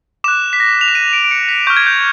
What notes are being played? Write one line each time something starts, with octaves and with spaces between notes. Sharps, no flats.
D6 F#6 E7
B6
A#6
F7
E7
D#7
D7
D7
C#7
B6
C#6 F6 G6
G#6
G6